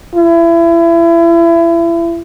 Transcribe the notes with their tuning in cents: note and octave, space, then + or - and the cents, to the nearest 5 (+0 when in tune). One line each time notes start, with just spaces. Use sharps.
E4 +30